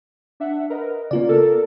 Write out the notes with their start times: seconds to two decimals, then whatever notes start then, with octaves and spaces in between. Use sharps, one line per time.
0.40 D4 E5 F#5
0.70 A#4 B4 D#5
1.11 C#3 A#3 B3 F4 D5
1.29 A4 A#4